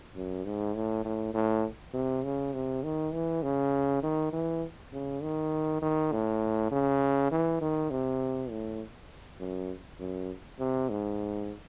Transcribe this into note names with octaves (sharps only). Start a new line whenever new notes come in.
F#2
G#2
A2
A2
A2
C3
C#3
C3
D#3
E3
C#3
D#3
E3
C#3
D#3
D#3
A2
C#3
E3
D#3
C3
A2
F#2
F#2
C3
G#2